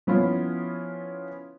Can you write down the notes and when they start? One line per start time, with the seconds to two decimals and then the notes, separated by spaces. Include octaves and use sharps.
0.07 F3 B3 C#4 E4 F4